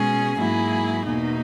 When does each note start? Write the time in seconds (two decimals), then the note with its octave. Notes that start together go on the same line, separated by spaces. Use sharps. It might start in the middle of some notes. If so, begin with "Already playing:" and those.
Already playing: B2 G#3 C#4 G#4
0.38 G#2 F#3 A#3 E4 G#4
1.07 E2 B2 A#3 D#4